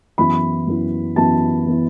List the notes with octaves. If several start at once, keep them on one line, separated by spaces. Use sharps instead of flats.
F#2 E3 B3 E4 B5
F#2 E3 B3 E4
F#2 E3 B3 E4 A5
E3 B3 E4